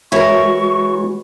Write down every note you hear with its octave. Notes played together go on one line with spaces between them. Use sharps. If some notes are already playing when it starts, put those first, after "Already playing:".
E3 G#3 E4 F#4 A#4 C#5 C#6